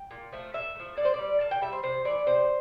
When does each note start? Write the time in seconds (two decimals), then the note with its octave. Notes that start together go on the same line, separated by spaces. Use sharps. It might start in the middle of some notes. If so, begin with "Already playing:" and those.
Already playing: G5
0.11 A#2
0.32 F3 A3
0.54 A#2 E5
0.75 F3 A3
0.97 A#2 D5
1.05 C5
1.14 G3 D5
1.40 A#2 A5
1.51 G5
1.61 G3 E5
1.72 C5
1.83 C3 C5
2.05 E3 A3 D5
2.26 C3 C5